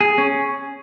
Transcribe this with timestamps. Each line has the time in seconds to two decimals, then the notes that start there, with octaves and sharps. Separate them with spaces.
0.01 G#4
0.18 C#4